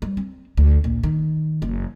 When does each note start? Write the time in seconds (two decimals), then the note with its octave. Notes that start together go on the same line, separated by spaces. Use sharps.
0.02 G3
0.17 C4
0.57 D2
0.84 A#1
1.03 D#3
1.62 F#1